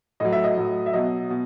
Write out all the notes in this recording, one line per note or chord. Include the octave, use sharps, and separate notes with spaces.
A2 F#3 D#5
E5
D#5
A2 F#3
E5
B2 F#3 D#5
B2